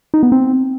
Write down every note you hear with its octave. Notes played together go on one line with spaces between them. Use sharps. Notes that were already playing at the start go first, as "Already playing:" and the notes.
D#4
B3
C4